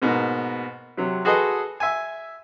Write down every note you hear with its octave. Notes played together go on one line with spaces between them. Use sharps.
G#2 B2 A#3
C3 F#3
F#4 G#4 A4 B4 D#5 C6
E5 G#5